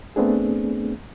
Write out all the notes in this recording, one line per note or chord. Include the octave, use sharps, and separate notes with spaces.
A3 B3 C4 D4 G#4